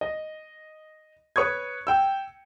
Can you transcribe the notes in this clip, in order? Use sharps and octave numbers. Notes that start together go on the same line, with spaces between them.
D#5
B4 C#5 C#6 D#6 G#6
G5 E6